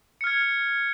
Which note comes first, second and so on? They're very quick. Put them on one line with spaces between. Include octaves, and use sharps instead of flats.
C#7 F6 G#6